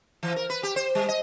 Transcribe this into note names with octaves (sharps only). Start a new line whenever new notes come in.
E3
A#4
B4
G4
C5
G3
D#5